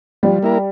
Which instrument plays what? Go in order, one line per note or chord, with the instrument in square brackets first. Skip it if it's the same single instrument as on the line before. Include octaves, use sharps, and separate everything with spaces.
[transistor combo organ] F3 [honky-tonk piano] G3
[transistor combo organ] A#3 E4 A#4